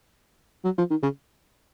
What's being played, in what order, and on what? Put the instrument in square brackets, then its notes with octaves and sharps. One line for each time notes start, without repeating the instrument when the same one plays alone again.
[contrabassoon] F#3
F3
D#3
C#3